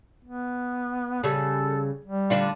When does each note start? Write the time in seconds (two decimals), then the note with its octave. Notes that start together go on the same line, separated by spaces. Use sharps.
0.25 B3
1.24 C#3 G3 A4
2.05 G3
2.30 D3 D4 F4